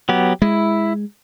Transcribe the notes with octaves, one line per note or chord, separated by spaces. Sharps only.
F#3 B3 G4
G#3 E4